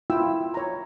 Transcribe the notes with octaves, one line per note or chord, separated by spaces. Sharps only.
E4 F4 G5 E6
C#5 A#5